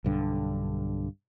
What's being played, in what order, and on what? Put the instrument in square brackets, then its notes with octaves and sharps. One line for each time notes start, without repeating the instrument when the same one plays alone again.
[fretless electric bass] B1 G2 D3